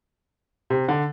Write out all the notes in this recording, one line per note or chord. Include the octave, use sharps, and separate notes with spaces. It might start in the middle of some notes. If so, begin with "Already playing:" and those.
C3
D3